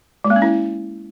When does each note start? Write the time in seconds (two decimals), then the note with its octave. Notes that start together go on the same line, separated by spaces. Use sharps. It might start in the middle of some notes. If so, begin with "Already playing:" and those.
0.24 G#3
0.30 A#3
0.36 C#4
0.42 E4